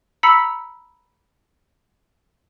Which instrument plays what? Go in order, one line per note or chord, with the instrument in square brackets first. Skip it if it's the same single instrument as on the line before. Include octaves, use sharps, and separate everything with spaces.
[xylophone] A#5 B5 E6 B6 C#7